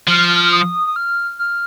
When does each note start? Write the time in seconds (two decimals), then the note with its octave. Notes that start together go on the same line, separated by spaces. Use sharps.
0.08 F3 F6
0.45 F6
0.53 D#6
0.87 D#6
0.96 F6
1.39 F6